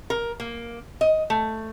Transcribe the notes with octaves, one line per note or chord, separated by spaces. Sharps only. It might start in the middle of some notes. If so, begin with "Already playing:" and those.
A#4
A#3
D#5
A3